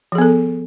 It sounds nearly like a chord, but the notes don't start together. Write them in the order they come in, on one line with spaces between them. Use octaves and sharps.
F3 G#4 B3 A4